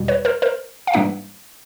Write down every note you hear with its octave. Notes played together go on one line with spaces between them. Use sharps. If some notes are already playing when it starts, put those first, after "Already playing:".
Already playing: E2 B2 G3
B4 C#5
A#4 C5
A#4 C5
F5
G#2 E3 G3 A#3 D4 E5 F#5